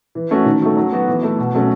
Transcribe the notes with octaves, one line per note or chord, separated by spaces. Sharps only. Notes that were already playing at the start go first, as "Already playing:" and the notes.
E3
A3 C#4 F#4
D#3
F#3 A3
F#3
B3 F#4
E3
A3 E4
B2
F#3 A3 C#4 F#4